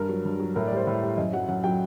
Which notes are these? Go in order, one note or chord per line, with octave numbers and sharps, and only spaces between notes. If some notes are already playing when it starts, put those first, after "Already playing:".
Already playing: G2 A#4
F#3
G2
F#3
A2 A#4
D5
G3 C5
A2
G3
F#2 D#5
F#3 F#5
F#2 F#5
F#3 G5